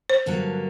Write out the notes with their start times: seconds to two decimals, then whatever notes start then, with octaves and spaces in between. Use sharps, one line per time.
0.10 C5
0.26 G2 D3 F#3 A#3